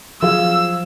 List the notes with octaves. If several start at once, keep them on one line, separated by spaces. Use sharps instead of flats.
F3 F#3 F4 G#4 F5 E6